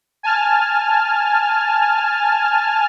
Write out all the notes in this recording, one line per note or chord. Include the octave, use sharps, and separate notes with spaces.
G#5 A5 F6